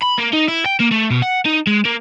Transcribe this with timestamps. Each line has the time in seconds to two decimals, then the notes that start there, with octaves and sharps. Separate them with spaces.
0.02 B5
0.18 A#3
0.33 D#4
0.48 E4
0.66 G5
0.80 A#3
0.92 A3
1.11 B2
1.22 F#5
1.46 D#4
1.67 G#3
1.85 A#3